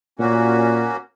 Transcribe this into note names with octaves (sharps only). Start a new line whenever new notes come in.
A#2 A#3 C#4 F#4